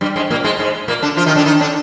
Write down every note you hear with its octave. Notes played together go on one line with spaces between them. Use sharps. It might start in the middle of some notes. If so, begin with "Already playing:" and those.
G2 G3
G#2 G#3
A#2 A#3
G#2 G#3
G#2 G#3
A#2 A#3
D3 D4
F3 F4
D#3 D#4
D3 D4
D#3 D#4
D3 D4